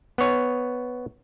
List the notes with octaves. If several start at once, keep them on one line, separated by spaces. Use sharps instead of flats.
B3 C#5